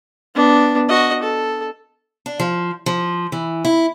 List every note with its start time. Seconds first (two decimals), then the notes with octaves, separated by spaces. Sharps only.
0.35 B3 D4
0.89 F#4 D#5
1.23 A4
2.26 D4
2.40 F3
2.86 F3
3.32 E3
3.65 E4